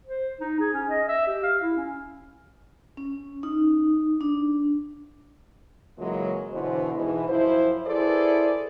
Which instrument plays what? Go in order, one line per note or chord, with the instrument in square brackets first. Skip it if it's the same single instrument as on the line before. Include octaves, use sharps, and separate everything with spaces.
[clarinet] C5
D#4
G#4
C#4
D#5
E5
G4
F5
E4
C#4
[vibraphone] C#4
D#4
D4
[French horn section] C#3 E3 F#3 G#3 A#3 F4
B2 D3 E3 C5
G#2 B2 E3
F#2 F3 E4 C5
E4 G#4 A4 B4 C5 D5